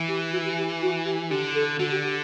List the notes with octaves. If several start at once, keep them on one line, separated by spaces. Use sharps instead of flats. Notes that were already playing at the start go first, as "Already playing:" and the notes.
Already playing: E3
G4
F#4
G4
G4
F#4
G4
D3 G4
A4
D3 F#4
G4
G4